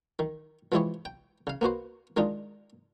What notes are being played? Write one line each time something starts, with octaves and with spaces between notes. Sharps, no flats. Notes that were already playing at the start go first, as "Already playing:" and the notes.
D#3
E3 F3 G#3 E4 G4 C#5
G5
C#3 F5
A#3 B3 F#4 C5
D#3 G#3 D4 D#4 F4